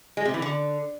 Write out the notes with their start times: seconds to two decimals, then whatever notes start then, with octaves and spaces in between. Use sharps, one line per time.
0.17 G#3
0.25 C3
0.34 E3
0.42 D3